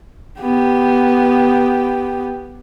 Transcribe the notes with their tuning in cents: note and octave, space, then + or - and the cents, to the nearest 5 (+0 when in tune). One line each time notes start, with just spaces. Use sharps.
B3 +0 G4 +0